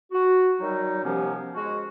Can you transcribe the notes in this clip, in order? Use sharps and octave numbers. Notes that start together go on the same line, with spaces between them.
F#4
D#3 F#3 G3 D#4
D#2 C3 F3 B3 C#4
G#3 F#4